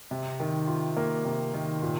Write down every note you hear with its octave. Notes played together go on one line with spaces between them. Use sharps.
C3
D#3
F4
A#3
C3
D#3
A#2